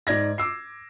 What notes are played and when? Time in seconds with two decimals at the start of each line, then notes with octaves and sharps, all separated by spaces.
0.07 G#2 D5 G#6 A#6
0.38 D6 E6 C7